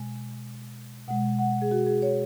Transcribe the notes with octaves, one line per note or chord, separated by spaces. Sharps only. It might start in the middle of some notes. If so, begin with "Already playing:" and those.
Already playing: B2 G#3 G#5
B2 G#3 F#5
F#5
G#4
F#4
G#4
C#5